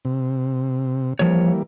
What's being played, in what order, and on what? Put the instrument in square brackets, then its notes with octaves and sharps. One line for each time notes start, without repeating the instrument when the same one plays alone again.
[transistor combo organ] C3
[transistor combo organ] E3 G3 A#3 [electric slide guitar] F3 C#5